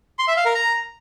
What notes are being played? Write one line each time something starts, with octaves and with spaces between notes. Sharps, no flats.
C6
E5
F5
A#4
A#5